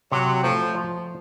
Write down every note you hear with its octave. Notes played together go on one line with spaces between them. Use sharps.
C3 F#3
F3 A3
F3